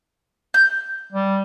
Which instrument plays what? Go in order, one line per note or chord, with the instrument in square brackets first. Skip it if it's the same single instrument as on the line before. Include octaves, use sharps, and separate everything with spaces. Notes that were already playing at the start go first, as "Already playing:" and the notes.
[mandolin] G6
[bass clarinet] G3